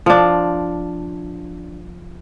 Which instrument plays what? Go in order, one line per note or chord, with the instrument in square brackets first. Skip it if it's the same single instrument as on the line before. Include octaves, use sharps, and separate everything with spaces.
[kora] F3 D4